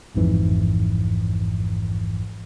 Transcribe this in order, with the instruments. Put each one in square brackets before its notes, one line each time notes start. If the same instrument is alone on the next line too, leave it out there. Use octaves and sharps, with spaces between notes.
[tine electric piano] A1 F2 G#2 E3 F3